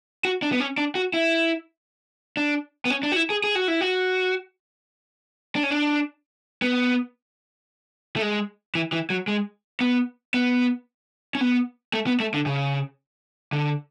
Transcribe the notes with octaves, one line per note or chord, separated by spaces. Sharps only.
F#4
D4
B3
C#4
D4
F#4
E4
D4
B3
C#4
D4
F#4
E4
G#4
G#4
F#4
E4
F#4
D4
C#4
D4
B3
A3
G#3
E3
E3
F#3
G#3
B3
B3
C#4
B3
A3
B3
A3
D3
C#3
D3